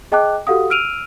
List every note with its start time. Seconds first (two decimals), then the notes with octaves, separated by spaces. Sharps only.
0.12 G#4 D#5 G5 A5 D6 F#6
0.47 F#4 G4 A4 F5 F#5 D#6
0.70 E6 F6 D7 D#7 F7